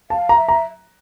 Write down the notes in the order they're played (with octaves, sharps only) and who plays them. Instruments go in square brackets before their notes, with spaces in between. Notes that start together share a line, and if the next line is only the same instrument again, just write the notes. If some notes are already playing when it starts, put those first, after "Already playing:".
[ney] F5 [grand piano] A5
[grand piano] A#5
[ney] E5
[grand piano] A#5